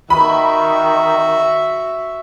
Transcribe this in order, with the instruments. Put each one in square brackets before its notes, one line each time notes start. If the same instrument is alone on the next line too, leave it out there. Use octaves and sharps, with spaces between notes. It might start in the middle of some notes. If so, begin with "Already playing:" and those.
[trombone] D#3 [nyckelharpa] F#4 E5 [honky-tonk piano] B5